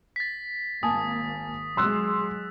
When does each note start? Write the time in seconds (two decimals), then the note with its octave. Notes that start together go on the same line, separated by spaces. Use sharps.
0.16 A6 B6
0.83 G#1 A#3 G#5 A5 D#6
1.77 F#3 G#3 C6 E6 F#6